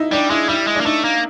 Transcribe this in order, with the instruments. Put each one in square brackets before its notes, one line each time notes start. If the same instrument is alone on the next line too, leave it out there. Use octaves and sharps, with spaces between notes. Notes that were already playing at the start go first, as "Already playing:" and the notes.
Already playing: [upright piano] D#4 E4
[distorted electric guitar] G3 [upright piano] D4
[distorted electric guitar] G#3 [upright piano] E4
[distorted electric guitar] G3 [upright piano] E4
[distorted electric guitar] G#3
[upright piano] D4
[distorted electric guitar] A#3
[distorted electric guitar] A3 [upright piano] D#4
[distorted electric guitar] A#3